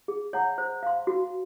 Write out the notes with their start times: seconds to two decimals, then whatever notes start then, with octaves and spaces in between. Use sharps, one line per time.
0.08 G#4
0.33 C#5 F#5 A#5
0.58 C5
0.83 F5 C6
1.07 F#4